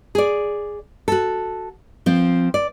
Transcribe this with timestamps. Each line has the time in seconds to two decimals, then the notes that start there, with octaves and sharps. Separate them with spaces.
0.15 G#4 D5
1.08 F#4 A4
2.06 F3 C4
2.54 D5